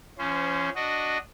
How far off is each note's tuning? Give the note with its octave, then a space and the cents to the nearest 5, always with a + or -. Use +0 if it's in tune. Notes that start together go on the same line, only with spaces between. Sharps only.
F3 -35 C#4 +0 C5 -25
D4 +0 F#4 +0 D#5 -10